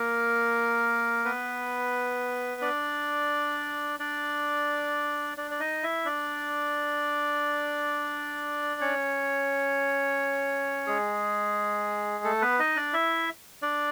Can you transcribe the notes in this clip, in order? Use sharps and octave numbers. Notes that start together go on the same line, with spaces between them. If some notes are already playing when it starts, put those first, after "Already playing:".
Already playing: A#3 A#4
B3 B4
D4 D5
D4 D5
D4 D5
D5
D#4 D#5
E4 E5
D4 D5
C#4 C#5
G#3 G#4
A3 A4
B3 B4
D#4 D#5
D4 D5
E4 E5
D4 D5